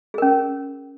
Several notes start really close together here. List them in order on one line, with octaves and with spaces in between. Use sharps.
G#4 A#4 C#4